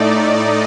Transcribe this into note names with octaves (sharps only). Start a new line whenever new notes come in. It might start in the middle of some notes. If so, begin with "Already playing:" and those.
Already playing: A2 A3 D#4 D5
D#5